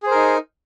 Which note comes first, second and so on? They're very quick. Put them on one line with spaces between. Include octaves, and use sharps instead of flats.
G#4 C5 A#4 D#4